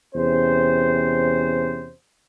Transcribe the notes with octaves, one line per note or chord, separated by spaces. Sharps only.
E2 C3 C#4 C5